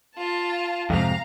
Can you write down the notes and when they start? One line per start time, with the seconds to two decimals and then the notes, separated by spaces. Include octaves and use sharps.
0.16 F4 A5
0.90 F2 G#2 C3 F5 A#5